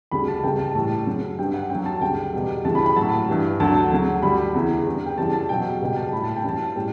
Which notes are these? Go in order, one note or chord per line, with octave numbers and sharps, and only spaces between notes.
D2 C#3 G3 B5
A5
C#2 C#3 G3 G5
A5
A2 E3 G3 A5
F#2 C#3 F#3
G2 D3 G3 G5
F#5
F#2 D3 F#3 G5
A5
D2 C#3 G3 G5
E2 B2 G3
D2 C#3 E3 G3 A5
B5
B5
A2 F#3 A5
G2 E3 G3
D2 D3 F#3 A5
D2 C#3 F#3
D2 D3 G3 B5
E2 C#3 E3
E2 D3 G3
G5
F#2 C#3 E3 G3 A5
A5
E2 B2 F#3 G5
C#2 B2 G3 G5
A5
A2 G3 B5
A5
G5
F#2 E3 G3 A5
A2 G3 G5